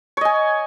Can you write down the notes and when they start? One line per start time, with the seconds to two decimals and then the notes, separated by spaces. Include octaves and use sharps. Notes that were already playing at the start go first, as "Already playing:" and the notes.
0.17 C#5
0.21 D#5
0.25 G#5